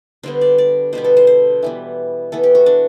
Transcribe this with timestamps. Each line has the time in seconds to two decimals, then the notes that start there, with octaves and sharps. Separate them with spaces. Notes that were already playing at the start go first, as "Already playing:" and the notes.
0.23 D3 G3 B3 C5
0.41 D5
0.58 D5
0.93 B2 G3 B3 C5
1.04 A4
1.17 C5
1.27 C5
1.63 E3 G3 B3
2.32 E3 B3 A4
2.43 G4
2.55 F#4
2.66 D4